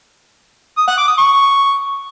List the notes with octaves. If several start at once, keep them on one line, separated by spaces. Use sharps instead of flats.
D#6
F#5
D6
D#6
C#6